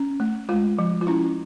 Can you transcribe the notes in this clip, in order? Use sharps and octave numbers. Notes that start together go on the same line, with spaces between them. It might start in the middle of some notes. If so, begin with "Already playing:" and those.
Already playing: C#4
A3
G#3 F4
F3
F4
C#4 E4